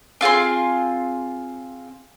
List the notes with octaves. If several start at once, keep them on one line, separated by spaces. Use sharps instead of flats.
C4 F4 G#4 C6